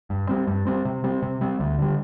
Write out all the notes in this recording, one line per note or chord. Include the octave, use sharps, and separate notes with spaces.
G2
G3 C4
G2
G3 C4
C3
G3 C4
C3
G3 C4
D2
D3 G3